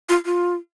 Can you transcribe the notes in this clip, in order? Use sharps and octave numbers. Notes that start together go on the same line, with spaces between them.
F4
F4